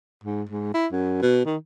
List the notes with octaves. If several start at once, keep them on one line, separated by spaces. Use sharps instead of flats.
G#2
G#2
E4
F#2
B2
D#3